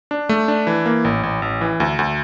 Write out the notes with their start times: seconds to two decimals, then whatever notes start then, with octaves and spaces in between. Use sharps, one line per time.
0.11 D4
0.29 A3
0.48 D4
0.67 E3
0.86 A#3
1.05 A1
1.23 A1
1.42 A1
1.61 E3
1.80 D2
1.99 D2